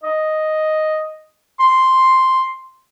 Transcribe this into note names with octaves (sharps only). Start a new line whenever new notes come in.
D#5
C6